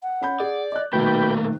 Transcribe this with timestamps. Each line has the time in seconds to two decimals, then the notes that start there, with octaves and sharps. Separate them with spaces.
0.03 F#5
0.21 C#4 B5 G6
0.40 G#4 D5
0.72 D#5 D6 F#6
0.93 D#1 B1 D#3 A3 A#3 F#4 B4 G5